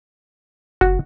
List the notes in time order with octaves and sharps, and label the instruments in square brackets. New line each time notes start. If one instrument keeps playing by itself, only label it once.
[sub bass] F#1 [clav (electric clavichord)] F#4